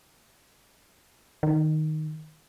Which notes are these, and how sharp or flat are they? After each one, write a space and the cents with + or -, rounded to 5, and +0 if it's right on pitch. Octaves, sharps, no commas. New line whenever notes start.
D#3 -5